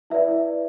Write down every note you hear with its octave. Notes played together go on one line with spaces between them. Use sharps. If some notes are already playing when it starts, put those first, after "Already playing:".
E4 B4 D5 E5